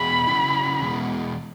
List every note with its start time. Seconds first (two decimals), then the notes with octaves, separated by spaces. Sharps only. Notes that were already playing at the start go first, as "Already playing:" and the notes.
Already playing: E2 B2 G#4 B5
0.27 C#3 F#3 C#4 E4
0.80 E2 B2 G#3